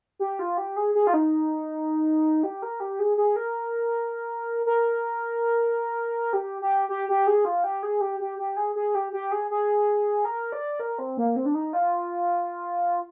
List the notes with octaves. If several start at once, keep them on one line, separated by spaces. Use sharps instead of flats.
G4
F4
G4
G#4
G#4
F4
D#4
G4
A#4
G4
G#4
G#4
A#4
A#4
G4
G4
G4
G4
G#4
F4
G4
G#4
G4
G4
G4
G#4
G#4
G4
G4
G#4
G#4
A#4
D5
A#4
C4
A#3
C4
D4
D#4
F4